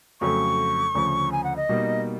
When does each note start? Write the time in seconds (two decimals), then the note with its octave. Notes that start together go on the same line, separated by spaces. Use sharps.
0.21 F2 C#3 F#3 A3 C#6
0.95 D2 C#3 F3
1.32 G#5
1.44 F#5
1.56 D#5
1.69 B2 G3 A#3 D#4